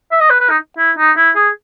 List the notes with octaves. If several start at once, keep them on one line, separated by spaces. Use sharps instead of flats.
E5
D#5
B4
B4
D#4
E4
D#4
E4
G#4